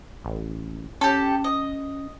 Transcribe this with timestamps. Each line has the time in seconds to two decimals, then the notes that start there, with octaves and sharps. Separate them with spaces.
0.25 A1
1.01 C#4 G4 A4
1.44 D#5